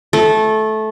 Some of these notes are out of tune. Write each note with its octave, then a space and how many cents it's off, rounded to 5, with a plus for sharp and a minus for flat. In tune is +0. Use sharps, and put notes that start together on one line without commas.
A3 -15